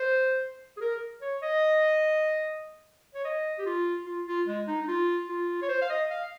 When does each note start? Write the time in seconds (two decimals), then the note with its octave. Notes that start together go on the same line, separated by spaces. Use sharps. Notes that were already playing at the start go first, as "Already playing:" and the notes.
Already playing: C5
0.77 G#4
0.81 A#4
1.22 C#5
1.42 D#5
3.14 C#5
3.25 D#5
3.59 G4
3.66 F4
4.06 F4
4.27 F4
4.47 G#3
4.67 D#4
4.82 D#4
4.88 F4
5.29 F4
5.62 C#5
5.69 C5
5.82 F5
5.90 D#5
6.10 F5